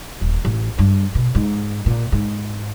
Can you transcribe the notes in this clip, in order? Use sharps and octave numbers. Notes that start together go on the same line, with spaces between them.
D#1
A1
G2
B2
G#2
A#2
G#2